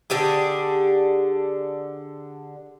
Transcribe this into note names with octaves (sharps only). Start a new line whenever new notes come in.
D3 D4 G4 G#4